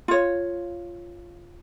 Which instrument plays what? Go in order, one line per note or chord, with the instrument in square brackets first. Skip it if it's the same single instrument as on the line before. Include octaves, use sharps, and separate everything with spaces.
[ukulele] F4 C#5